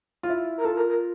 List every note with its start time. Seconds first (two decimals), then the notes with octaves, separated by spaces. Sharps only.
0.23 F4
0.29 E4
0.58 A#4
0.65 F4 A4
0.76 A#4
0.89 A#4